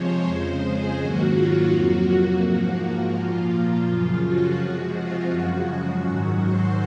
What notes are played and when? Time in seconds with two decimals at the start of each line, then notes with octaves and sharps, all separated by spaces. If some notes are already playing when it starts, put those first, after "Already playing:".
Already playing: C3 F3 G#3 C5 C#5
0.24 F2 C#3 G#3
0.61 G#4
0.97 G#2 D#3 F#3 A#3 F#4
1.32 F4
1.69 F2 C3 F#3 A#3 F#4
2.40 G#2 F3 A#3 F#4
3.13 A#2 F3 A#3 F4
3.49 F4
3.85 F#2 C#3 F3 F4
4.22 F#4
4.57 C3 F3 G#3 F#4
4.94 F4
5.29 F#2 C#3 F3 G#3 F#4
5.66 F#4
6.02 G#2 D#3 F#3 F#4
6.38 C5